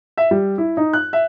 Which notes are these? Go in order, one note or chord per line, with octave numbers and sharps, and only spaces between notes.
E5
G3
E4
D#4
F#6
E5